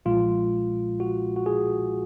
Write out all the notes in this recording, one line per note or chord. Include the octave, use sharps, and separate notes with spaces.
B1 A#2 F3 G#3 F4
F#4
F#4
G#4